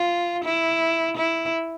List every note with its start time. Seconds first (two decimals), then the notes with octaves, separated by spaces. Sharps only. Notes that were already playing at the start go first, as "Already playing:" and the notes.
Already playing: F4
0.44 E4
1.17 E4